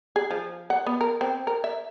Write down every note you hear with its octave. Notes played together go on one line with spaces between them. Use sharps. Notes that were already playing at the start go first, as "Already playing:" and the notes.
G#4
F3
F#5
B3
A#4
C4
A#4
E5